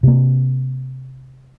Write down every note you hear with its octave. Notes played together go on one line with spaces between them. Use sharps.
C3 A#3